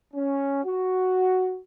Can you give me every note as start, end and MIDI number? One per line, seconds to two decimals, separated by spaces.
0.14 0.63 61
0.64 1.59 66